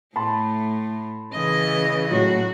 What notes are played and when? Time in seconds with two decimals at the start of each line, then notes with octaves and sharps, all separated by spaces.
0.16 A2 A3 A5 B5 C6
1.33 C#3 E3 D#5
2.11 A2 F#3 F#4